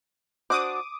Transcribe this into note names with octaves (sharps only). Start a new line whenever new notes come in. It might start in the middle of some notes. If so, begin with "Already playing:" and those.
D4 F#4 C5 D6 D#6